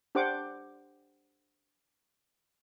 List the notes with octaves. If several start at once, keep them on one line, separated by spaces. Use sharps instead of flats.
D4 G4 C5 F#5 D6